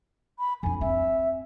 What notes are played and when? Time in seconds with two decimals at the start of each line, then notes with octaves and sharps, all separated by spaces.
0.39 B5
0.63 F2 D4 G#5
0.81 C4 E5